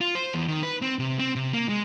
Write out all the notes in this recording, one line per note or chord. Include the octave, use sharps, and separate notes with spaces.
F4
C5
E2
D#3
B4
C4
C3
C4
C3
A#3
G#3